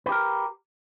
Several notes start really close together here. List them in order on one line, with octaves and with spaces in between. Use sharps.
B4 G4 A#4